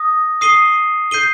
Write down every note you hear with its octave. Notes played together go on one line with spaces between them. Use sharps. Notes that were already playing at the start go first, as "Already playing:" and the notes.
Already playing: D#6 A#6
D#6 C7 D#7 G7
G6 C7 D#7 G7